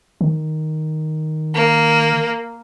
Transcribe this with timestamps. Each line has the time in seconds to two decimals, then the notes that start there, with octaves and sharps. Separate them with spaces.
0.21 D#3
1.55 A#3